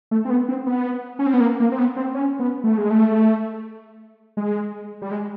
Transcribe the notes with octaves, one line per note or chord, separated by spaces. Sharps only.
A3
C4
B3
C4
B3
C#4
C4
B3
A#3
A#3
C4
B3
C4
C#4
B3
A3
G#3
A3
G#3
G3
G#3